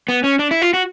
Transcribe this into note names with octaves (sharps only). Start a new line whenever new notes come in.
B3
C#4
D4
E4
F4
F#4